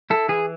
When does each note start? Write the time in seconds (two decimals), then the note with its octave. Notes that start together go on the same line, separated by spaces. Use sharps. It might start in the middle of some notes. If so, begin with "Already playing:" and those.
0.10 E4 A4
0.29 E3 G#4